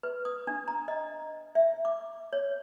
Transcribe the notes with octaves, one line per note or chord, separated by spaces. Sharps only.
B4
D#6
D4
A#5
D#5
E5
D6
C#5